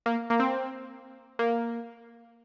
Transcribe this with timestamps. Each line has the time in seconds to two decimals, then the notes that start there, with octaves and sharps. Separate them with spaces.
0.06 A#3
0.30 A#3
0.40 C4
1.39 A#3